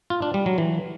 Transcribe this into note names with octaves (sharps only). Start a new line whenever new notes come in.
F4
D4
G3
F#3
E3